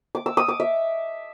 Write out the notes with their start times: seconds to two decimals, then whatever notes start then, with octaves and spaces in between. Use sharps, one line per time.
0.15 D6
0.26 E6
0.37 D#6
0.48 D6
0.60 E5